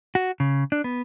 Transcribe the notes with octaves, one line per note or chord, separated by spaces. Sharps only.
F#4
C#3
D4
B3